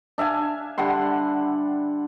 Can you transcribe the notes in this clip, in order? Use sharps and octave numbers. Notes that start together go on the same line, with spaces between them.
D4 E5 F5 G#5
D3 G3 F#5 C6